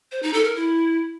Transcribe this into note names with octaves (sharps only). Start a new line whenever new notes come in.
C5
D#4
A4
A#4
E4